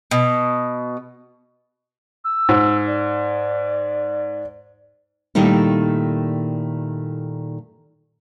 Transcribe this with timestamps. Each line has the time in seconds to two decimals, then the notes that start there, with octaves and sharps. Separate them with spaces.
0.11 B2
2.24 E6
2.49 G#2
2.86 D5
5.35 A#2 D#3 G3 A3 D#4 E4